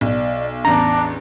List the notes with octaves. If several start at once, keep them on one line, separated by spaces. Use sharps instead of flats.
B1 D5
A1 E2 D4 A#5